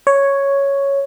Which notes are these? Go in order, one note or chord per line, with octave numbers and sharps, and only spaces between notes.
C#5